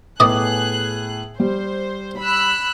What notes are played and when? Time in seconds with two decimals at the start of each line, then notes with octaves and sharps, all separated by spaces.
0.20 A2 B3 G#4 D5 D#5 F#6
1.40 G3 C5
2.20 B5 E6 F#6